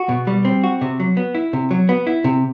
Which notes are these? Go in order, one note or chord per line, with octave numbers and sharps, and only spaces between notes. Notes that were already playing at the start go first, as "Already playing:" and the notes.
Already playing: F#4
B2
G3
C4
F#4
C3
F#3
B3
E4
C3
F#3
B3
E4
C3